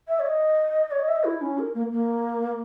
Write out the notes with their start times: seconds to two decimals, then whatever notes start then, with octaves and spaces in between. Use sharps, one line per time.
0.08 E5
0.19 C#5
0.25 D#5
0.91 C#5
0.99 D#5
1.08 E5
1.16 D#5
1.24 E4
1.41 C#4
1.58 A#4
1.74 A#3
1.91 A#3